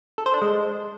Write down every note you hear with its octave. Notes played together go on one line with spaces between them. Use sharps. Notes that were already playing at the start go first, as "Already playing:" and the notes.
A4
C5
D4
G#3